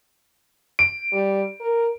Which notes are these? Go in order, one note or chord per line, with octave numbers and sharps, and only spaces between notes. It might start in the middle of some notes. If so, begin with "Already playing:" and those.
D7
G3
A#4